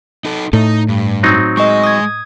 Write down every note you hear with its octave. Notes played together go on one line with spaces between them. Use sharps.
D#4 A4
A2 A3 D#4
G2
F#3 C4 D#4
G#3 D#5 C#6
D#6 G#6